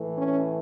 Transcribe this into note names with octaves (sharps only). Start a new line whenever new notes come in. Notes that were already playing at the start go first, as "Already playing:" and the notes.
Already playing: A2 E3 A3
C#4